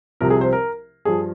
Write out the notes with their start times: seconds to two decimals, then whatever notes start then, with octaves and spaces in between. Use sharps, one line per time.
0.21 C2 C3 F3 A#4
0.30 G#4
0.41 C5
0.53 A#4
1.05 G2 F3 G#4